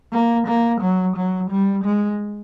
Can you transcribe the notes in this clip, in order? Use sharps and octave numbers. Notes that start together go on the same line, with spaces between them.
A#3
A#3
F#3
F#3
G3
G#3